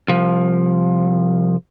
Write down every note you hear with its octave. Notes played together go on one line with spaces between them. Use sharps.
C2 F3